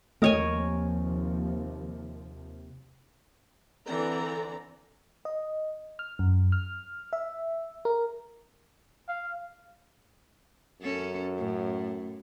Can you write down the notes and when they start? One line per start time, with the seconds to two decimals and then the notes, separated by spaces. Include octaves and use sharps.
0.22 D#2 C3 F3 A3 A#4 C#5 D#5 G#5
3.87 D3 E3 C4 D5 A#5
5.25 D#5
5.99 F6
6.19 F#2
6.52 F6
7.13 E5
7.85 A#4
9.08 F5
10.82 F#2 C#4 A4
11.37 A2